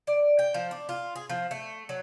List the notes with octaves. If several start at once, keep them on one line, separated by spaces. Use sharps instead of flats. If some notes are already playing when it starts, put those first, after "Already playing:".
D5
G5
F3
D4
F4
G#4
F3
A3
F#3